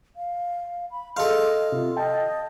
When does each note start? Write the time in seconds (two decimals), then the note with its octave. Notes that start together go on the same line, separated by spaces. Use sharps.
0.16 F5
0.91 B5
1.17 G#4 A4 D#5 F5 C6
1.72 C3 F4
1.97 D#5 G5 A5